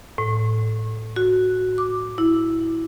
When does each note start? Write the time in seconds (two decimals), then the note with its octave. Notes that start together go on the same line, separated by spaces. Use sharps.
0.18 A2
1.16 F#4
1.78 D6
2.18 E4